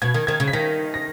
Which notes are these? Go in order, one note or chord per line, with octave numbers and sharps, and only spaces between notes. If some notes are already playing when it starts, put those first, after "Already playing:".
B2 G#6
D#3
D#3 G#6
C#3
B6
D#3 A#6
A#6